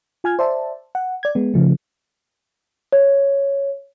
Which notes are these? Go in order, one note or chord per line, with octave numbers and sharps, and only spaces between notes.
F4 G#5 F6 G#6
C5 D5 E5 A5
F#5
D5 G#6
G#3 B3
C#3 F3 A3
C#5